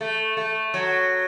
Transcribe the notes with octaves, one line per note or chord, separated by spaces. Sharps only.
A3
A3
F#3